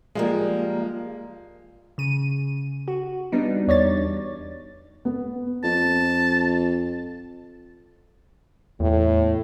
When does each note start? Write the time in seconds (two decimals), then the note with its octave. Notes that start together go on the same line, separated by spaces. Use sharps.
0.15 F3 G3 G#3 A#3
1.98 C#3 D#7
2.88 F#4
3.32 G3 B3 D4 D#4
3.68 E2 C#5 D5 A6
5.05 B3
5.64 F2 A5
8.80 E2 A2